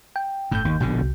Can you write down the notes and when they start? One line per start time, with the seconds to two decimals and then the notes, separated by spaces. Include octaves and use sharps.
0.16 G5
0.52 G1 A2 G6
0.65 D#2
0.80 A#1 B2 D3
1.01 C2